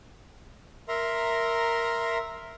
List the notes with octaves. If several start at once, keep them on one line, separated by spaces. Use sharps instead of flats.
A#4 E5 A#5 C6